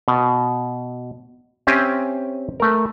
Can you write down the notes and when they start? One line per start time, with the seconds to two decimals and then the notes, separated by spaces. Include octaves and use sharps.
0.08 B2
1.67 C4 C#4 G4 E5 G#5
2.60 A3 A#4